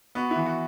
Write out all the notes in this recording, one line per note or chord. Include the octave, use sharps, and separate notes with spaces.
B3 F#4
E4
E3
F#4